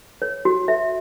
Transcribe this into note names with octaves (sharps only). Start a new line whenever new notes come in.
C#5
F#4
E5